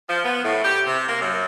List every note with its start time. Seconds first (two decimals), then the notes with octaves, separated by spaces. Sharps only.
0.08 F3
0.25 B3
0.44 A2
0.63 G4
0.86 C3
1.08 A#3
1.21 F#2